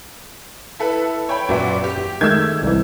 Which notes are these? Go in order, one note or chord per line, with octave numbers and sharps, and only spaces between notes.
E4 A4 B4
C#5 G5 B5
F#2 A#2 B3 F#4 C#5 E5
G4
D#3 G#3 A3 E6 G6 G#6
C2 E3